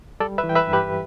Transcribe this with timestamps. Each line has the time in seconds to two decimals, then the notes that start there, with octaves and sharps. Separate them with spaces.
0.20 G3 A4 D5
0.38 B4 E5
0.44 E3
0.49 G5
0.56 B4 E5
0.67 G2
0.73 G4 B4